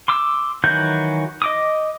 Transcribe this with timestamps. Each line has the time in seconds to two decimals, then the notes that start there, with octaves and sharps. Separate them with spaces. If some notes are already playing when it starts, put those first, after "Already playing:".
0.08 C6 D6 E6
0.64 D#3 E3 F#3 F#4 G6
1.42 D#5 D6 D#6